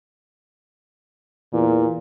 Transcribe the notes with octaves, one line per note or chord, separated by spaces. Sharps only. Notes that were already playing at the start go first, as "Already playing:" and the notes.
E2 A#2